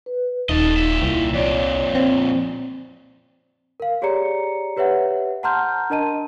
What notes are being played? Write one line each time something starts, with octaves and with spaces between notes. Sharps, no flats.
B4
D#1 D#4 A4 D#5
A#2 E5
C2 E4
F2 A#2 C#5 D5
C4
A#4 F5
G4 G#4 C#5 D5 A#5 C#7
G4 B4 C#5 E5 F#5
F#5 A5 A#5 C6 F6 G6
D4 A#4 D#5 A5 D#7